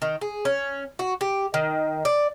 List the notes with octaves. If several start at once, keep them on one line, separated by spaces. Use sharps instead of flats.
D#3
G#4
C#4
F#4
G4
D#3
D5